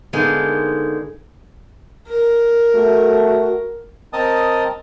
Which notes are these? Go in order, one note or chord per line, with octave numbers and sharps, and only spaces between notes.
D3 G#3 A#3 B3 D#4 G#4
A#4
A3 F#4
C4 A#4 D#5 A5 D#6